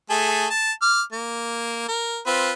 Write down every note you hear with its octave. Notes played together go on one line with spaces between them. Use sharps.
A3 G#4 A4
A5
D6 F6
A#3
A#4
C4 F4 B4